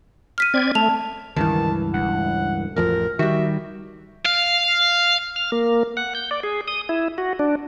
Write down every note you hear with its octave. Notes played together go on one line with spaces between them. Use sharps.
F6 B6 D#7
C4 D5 G#6
A3 A5 F7
C#2 G2 D#3 E3 A5
E1 F#5
A1 F2 F3 A#4
D#3 G3 F#4 E5
F5
F6
A#3
F#5
G6
D5
G#4
D#6
E4
F#4
D4